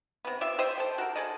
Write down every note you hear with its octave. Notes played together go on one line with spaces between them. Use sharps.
C3 B3
F4 G4 E5
G4 C5 D#5 G5
A4 G5
F#4 A#4
G#4 A4 D#5